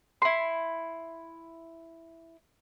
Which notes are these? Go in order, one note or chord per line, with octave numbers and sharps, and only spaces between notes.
E4 C6